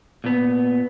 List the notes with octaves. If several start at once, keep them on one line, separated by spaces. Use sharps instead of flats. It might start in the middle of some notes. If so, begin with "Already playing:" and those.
A#2 B3